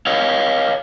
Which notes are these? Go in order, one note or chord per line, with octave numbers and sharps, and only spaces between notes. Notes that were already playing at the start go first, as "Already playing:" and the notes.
C#5 D#5 F5